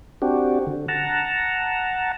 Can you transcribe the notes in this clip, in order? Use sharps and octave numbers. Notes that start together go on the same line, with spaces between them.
C4 D4 F#4 G4
D3
F#5 A5 A#5